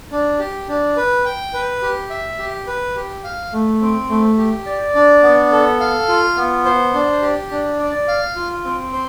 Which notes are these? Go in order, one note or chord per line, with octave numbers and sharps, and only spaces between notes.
D4
G4
D4
B4
G5
B4
G4
E5
G4
B4
G4
F5
A3
C4
A3
G4
D5
D4
B3
A4
F5
F4
B3
C5
D4
G4
D4
D5
F5
F4
C4
C5